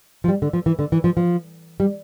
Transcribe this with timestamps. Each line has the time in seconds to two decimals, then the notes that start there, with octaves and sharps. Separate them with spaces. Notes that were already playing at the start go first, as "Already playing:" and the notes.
0.24 F3
0.28 G3
0.42 D3
0.53 F3
0.66 E3
0.79 D3
0.92 E3
1.04 F3
1.17 F3
1.80 G3